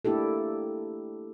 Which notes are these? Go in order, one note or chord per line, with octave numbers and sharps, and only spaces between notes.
A3 A#3 D4 E4 G4 A4